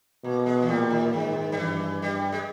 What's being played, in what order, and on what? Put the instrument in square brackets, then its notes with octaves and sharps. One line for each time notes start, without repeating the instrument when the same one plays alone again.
[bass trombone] B2 [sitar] A#3
[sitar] G#3
E3
[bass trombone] A#2 [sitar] G3
[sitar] D#3
[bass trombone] G#2 [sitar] D#3
[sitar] G3
[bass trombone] G2 [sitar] E3
[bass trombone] G2 [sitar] G3
[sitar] G#3